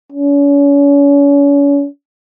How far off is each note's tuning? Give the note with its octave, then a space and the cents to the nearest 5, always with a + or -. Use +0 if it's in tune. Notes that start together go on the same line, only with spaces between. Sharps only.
C#4 +35